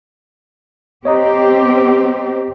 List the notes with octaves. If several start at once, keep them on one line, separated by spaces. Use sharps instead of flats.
C4 G4 C#5 D#5 A#5